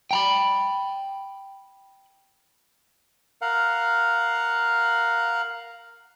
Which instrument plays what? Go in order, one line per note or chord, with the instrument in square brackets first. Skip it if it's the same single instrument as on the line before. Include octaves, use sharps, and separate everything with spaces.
[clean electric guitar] G5 A#5 B5
[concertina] A#4 F5 F#5